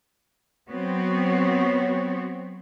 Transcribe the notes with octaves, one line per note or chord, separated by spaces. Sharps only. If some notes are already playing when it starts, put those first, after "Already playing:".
F#3 B3 C4 F#4 C#5